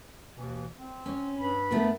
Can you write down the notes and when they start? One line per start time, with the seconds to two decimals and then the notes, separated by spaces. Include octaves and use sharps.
0.35 D#2 B2 E3
0.77 C4
1.06 C#4
1.38 G2 B5
1.71 A3 B3 A#4